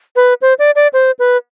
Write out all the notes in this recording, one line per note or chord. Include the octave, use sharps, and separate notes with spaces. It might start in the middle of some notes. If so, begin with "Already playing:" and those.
B4
C5
D5
D5
C5
B4